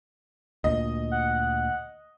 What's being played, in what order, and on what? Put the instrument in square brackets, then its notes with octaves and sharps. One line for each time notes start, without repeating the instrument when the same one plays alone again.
[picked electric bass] D2 A#2 [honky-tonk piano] D#5
[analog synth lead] F#5